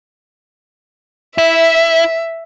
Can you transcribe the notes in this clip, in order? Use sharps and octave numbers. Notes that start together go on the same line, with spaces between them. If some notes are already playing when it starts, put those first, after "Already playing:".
E4 E5